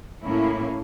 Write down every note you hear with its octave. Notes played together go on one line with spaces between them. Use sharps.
A2 A#3 C#4 E4